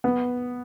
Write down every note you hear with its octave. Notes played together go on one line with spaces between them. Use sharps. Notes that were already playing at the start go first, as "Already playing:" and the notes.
B3